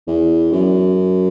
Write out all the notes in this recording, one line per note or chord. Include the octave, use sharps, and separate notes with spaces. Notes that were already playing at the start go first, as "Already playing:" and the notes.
E2
F#2